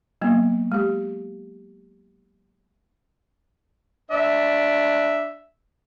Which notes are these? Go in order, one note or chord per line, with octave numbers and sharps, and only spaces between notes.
F#3 A#3 B3
G#3 G4
D4 E5